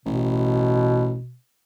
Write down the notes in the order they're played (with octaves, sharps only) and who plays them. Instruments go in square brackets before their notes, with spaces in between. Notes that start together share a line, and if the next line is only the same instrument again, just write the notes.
[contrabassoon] A1 [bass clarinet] B2